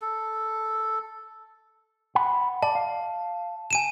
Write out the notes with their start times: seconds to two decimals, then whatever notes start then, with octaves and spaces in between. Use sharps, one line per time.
0.02 A4
2.15 F#5 B5
2.63 D5 A5
2.75 F5
3.71 G#5 D#7 E7